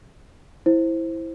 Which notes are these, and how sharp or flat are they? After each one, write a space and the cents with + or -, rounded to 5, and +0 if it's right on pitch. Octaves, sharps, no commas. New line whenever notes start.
E4 +0 C5 +10